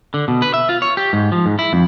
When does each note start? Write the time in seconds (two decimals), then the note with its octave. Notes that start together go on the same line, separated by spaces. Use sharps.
0.14 D3
0.28 B2
0.42 B4
0.54 E5
0.69 F4
0.82 C#5
0.97 G4
1.13 G#2
1.32 F3
1.46 G#2
1.59 E4
1.73 F2